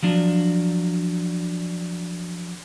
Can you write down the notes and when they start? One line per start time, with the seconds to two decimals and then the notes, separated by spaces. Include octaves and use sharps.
0.03 F3 F#3 D4